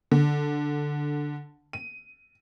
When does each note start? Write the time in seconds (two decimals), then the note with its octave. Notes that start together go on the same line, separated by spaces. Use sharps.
0.11 D3
1.73 D#7